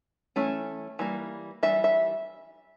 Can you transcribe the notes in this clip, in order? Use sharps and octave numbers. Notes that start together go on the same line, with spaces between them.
E3 A3 C#4
E3 G3 A#3
E3 G3 E5
E5